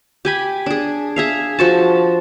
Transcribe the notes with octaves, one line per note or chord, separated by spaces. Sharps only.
G4 G#5 B5
D4 G#4
G#4 E5 F5
F3 F#4 A5